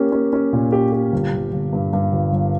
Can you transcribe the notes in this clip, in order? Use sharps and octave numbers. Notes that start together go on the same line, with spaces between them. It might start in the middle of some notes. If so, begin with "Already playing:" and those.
Already playing: A#3 C#4 G4
C#4
C#4
A#2
G4
G4
G1
G1
G1
G2
G2
G1
G1